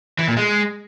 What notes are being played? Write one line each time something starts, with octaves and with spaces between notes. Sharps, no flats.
E3
A#2
G#3